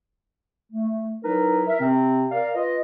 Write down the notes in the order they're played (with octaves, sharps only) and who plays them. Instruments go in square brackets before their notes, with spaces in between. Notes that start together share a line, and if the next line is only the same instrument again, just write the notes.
[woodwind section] A3
F#3 D#4 E4 A#4 B4
A#4 E5
C3 C4
A#4 D5 F5
F4 B4 D#5